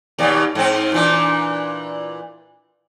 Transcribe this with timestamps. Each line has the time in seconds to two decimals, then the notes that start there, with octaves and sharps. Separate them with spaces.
0.19 D#2 B2 D5
0.55 G#2 C4
0.92 A#2 E3 D4